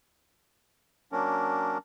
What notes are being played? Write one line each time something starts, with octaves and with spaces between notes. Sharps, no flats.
F#3 A#3 C#4 D4 A#4